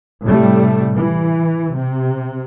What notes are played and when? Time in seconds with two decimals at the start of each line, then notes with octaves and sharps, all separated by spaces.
0.23 A2 C3 G3 A3
0.96 E3
1.75 C3